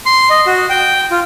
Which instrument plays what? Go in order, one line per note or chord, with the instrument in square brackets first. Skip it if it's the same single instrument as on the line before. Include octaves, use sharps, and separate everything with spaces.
[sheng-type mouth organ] C6
D#5
F#4
G5
F4